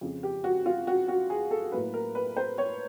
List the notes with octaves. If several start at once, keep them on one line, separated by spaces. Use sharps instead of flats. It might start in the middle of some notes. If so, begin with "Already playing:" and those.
F2 C#3 F3
G4
F#4
F4
F#4
F#4
G#4
A4
A2 F#3 A#3 B4
A#4
B4
C5
C#5